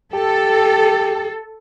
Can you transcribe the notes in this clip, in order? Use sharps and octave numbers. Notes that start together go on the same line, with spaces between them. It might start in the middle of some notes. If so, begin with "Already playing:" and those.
G4 A4